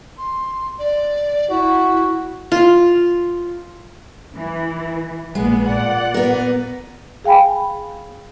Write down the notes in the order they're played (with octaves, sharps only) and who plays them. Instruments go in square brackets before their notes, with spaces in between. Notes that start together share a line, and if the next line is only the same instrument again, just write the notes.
[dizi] C6
D5
[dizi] E4 [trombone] F#4
[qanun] F4
[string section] E3
[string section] A#1 A#2 B3 [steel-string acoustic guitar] G#3
[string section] A#2 D5 F#5
[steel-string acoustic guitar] B3 A#4
[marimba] G#4 F5 G5 G#5 B5